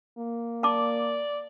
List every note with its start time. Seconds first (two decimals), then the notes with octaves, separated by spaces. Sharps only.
0.18 A#3
0.63 D5 A5 D6